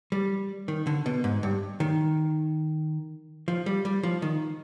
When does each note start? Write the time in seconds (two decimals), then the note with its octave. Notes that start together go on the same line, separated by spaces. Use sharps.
0.12 G3
0.68 D#3
0.87 D3
1.06 B2
1.24 G#2
1.43 G2
1.80 D#3
3.48 F3
3.66 G3
3.85 G3
4.03 F3
4.22 D#3